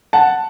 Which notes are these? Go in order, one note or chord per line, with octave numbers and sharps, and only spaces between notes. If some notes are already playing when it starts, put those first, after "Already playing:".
F#5 A5